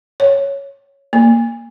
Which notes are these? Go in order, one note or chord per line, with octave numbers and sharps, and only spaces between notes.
C#5
A#3